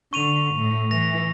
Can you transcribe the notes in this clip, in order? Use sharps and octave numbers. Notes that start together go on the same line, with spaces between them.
D3 C#6 D#7 F7
A2
E3 A#6 F7